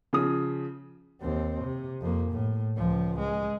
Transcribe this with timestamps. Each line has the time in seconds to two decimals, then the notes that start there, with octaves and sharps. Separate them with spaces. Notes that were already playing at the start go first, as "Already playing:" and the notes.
0.13 C#3 F3 D#6
1.22 D#2 C4
1.64 C3
2.02 F2 A#3
2.32 A2
2.77 C#2 F3
3.19 G#3